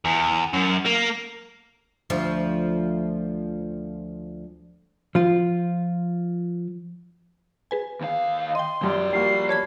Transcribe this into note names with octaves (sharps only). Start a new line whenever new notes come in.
E2
F#2
A#3
D2 F3
F3 F4
G#4 B4 G#5
D#2 F5
D#5 G5 C6
F#2 F3 G3 D5
G3 A#3 F#4 C7
C#5 A5 B5 G#6